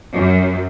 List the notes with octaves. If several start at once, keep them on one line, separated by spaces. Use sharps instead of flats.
F#2